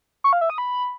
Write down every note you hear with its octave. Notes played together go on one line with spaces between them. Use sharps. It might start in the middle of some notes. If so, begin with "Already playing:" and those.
C#6
F5
E5
D#6
B5